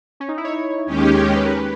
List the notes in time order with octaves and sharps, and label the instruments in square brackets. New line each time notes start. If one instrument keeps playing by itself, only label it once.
[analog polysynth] C#4
D#4
E4
C#5
[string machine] D#2 D#3 G#3 C#4 G4
[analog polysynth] B4
A#4
B4